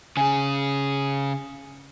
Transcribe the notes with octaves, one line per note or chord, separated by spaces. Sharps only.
C#3 G#4 G#5